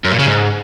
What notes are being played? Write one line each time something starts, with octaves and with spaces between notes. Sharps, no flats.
F#2
A#2
C#3
G#2